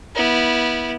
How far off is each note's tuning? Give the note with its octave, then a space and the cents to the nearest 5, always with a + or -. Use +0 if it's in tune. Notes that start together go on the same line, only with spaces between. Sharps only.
B3 -25 E4 -15